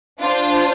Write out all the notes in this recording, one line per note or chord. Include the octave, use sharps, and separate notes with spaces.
D4 F4 C5